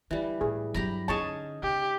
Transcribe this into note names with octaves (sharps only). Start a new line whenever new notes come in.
D3 E3 G3
A2 G#4
G2 F#3 G4 A#5 B5
D3 C#4 D#4 G#4 A5 C#6
C#3 G4